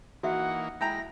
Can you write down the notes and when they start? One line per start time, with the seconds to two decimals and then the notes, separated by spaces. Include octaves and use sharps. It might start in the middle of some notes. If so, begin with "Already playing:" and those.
0.23 E3 A#3 D#4 F#4 E5 F#5
0.81 G#3 E4 G5 A#5 B5 A#6